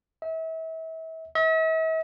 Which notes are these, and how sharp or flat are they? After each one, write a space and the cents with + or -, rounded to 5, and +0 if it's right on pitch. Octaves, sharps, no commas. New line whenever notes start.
E5 -35
E5 -45